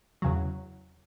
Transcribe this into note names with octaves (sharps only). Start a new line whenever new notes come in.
E2 C#3 F#3